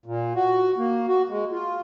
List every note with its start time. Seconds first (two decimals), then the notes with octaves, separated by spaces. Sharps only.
0.06 A#2
0.36 F#4
0.78 A#3
1.08 F#4
1.29 G#3
1.52 F4